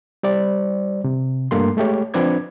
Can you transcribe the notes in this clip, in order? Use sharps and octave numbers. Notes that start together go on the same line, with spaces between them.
G3 C5 D5
C3
G2 A3 A#3 A4 C6
G#3 A3 G4 C#5
F3 C4 D4 B4 D6 G#6